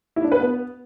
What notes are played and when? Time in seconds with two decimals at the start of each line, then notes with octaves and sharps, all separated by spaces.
0.16 E4
0.24 D4
0.32 B4
0.39 B3